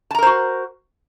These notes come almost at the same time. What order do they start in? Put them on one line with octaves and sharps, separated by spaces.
A5 A#5 A#4 C5 F#4